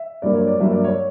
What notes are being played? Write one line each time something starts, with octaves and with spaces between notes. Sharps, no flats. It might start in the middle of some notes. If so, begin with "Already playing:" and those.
Already playing: E5
G2 F#3 A#3 D5
C#5
D5
G2 F#3 A#3 E5
D5
C#5